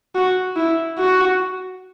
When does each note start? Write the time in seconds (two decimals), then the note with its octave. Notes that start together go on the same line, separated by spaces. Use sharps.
0.15 F#4
0.56 E4
0.99 F#4